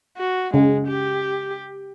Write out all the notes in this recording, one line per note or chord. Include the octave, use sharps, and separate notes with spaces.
F#4
C#3 G#3
G4